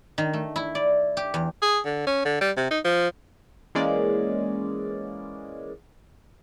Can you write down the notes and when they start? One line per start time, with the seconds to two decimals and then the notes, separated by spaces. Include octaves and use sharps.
0.18 D#3
0.34 A3
0.56 E4
0.75 D5
1.17 G4
1.34 E2
1.62 G#4
1.85 D3
2.07 C#4
2.25 D3
2.41 G3
2.57 C3
2.71 D#4
2.85 F3
3.75 E3 G#3 A#3 C#4 D5